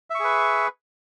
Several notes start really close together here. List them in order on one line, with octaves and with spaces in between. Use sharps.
E5 C#6 G#4 B4